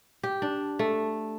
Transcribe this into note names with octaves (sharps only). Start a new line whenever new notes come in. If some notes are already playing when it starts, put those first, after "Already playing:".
G4
D4
A3